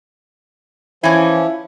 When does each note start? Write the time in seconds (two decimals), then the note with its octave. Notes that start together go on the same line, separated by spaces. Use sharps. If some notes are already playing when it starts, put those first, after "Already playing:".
1.03 E3 F3 C#4 E4